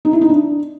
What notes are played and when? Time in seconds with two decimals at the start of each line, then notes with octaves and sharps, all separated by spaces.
0.05 D#4
0.13 E4
0.21 D#4
0.30 D4